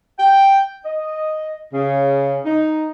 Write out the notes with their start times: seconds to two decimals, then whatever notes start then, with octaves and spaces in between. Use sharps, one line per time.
0.19 G5
0.84 D#5
1.73 C#3
2.44 D#4